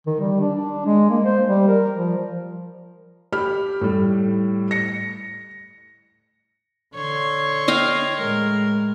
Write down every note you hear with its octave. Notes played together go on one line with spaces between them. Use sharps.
D#3
G3
D4
D4
G#3
A#3
C5
G3
A#4
F3
G4 B5 F6
A2 G3
A#6 C#7
D3 C#5 C6
D#5 F5 G5
A2 G#3 A#4